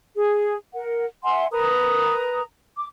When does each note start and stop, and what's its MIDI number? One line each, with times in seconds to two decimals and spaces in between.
0.16 0.54 68
0.74 1.05 70
0.74 1.05 78
1.24 1.46 76
1.24 1.46 78
1.24 1.46 80
1.24 1.46 84
1.52 2.41 70
1.52 2.41 71
1.52 2.41 82
1.52 2.41 87
2.77 2.85 86